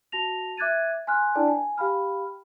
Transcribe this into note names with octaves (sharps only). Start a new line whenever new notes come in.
F#4 A5 A#6 F7
E5 D6 F#6 G#6 A6 D#7
G#5 C6 F6 F#6
D4 E4 A4 D5 G5 A5
G#5
G4 F5 G5 B5 F6